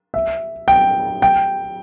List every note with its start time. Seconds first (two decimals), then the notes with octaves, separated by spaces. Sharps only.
0.14 E5
0.68 G5
1.22 G5